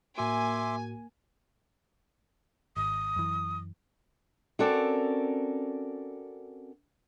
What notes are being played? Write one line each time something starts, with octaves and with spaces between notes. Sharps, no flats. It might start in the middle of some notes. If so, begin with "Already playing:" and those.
A2 A#3 F#4 E5 G#5 C6 D6
G#1 D#6
F#2 E3
C4 C#4 F#4 A4 A#4 D5